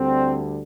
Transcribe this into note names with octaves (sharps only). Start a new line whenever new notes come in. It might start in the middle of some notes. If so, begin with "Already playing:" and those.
Already playing: D2 D3 G3 C4